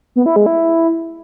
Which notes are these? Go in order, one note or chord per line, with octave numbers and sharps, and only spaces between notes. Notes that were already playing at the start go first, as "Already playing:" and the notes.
B3
E4
G#3
E4